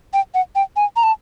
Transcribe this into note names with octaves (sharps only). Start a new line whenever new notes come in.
G5
F#5
G5
G#5
A#5
A5